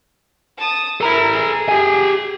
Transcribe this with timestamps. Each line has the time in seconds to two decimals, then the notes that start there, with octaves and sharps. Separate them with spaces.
0.57 A5 D#6
1.01 E4 A4 A#4 A#5
1.32 G#4
1.69 G4 G#5